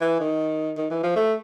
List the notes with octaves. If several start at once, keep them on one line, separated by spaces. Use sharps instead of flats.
E3
D#3
D#3
E3
F3
A3